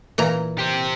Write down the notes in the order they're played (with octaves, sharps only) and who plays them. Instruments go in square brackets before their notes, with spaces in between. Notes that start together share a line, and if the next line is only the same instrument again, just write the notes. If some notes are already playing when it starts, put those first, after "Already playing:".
[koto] A#2 E3 A#5
[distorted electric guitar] G4 C5